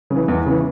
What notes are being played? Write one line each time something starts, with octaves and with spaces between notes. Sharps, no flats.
C#3 E3
E2
C#3 E3